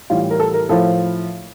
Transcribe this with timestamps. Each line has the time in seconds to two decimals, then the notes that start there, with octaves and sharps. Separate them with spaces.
0.10 A2 E3 G3 F4
0.31 A#4
0.40 A4
0.54 A#4
0.69 A2 F3 A4